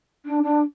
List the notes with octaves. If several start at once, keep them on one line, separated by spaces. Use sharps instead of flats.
D4
D4